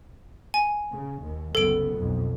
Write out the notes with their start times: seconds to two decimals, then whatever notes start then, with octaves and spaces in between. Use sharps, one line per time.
0.54 G#5
0.91 C#3
1.21 D#2
1.55 F#1 C2 B3 A4 D7
1.94 B1 F2